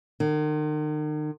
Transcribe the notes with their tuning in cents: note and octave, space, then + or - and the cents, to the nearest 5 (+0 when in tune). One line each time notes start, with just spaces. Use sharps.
D#3 -40